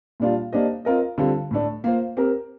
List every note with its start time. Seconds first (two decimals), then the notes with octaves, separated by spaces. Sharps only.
0.20 A#2 G3 D4 F4
0.53 A#3 D4 G4 C5 D#5
0.85 C4 F4 A#4 D#5
1.18 D3 G3 C4 F4
1.51 A2 A3 D4
1.84 A#3 F4 C5
2.17 C4 G4 A#4